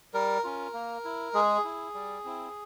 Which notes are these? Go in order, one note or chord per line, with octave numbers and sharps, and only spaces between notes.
G3 A#4
C#4 F4
A#3
E4
G#3 G#4
E4
G3
C4 E4